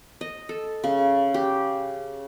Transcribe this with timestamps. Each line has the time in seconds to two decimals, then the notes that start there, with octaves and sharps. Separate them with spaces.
0.21 D#5
0.49 A4
0.84 C#3
1.34 G4